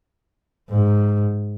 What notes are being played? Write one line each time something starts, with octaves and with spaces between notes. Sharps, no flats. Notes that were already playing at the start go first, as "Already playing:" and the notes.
G#2